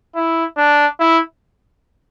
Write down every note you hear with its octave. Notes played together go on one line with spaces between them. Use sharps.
E4
D4
E4